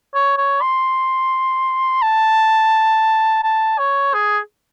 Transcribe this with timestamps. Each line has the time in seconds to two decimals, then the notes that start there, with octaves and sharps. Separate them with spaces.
0.14 C#5
0.38 C#5
0.61 C6
2.02 A5
3.44 A5
3.79 C#5
4.14 G#4